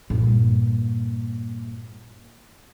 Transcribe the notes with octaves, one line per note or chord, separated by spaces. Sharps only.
G2 A#2